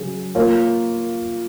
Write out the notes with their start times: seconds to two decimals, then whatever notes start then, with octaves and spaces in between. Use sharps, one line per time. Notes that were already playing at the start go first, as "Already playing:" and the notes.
Already playing: C#3 F#3 G#4
0.35 A#3 F4 A#4 C#5